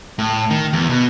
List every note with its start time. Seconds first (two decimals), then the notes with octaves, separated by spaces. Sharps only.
0.19 A2
0.50 D#3
0.73 E2
0.89 B2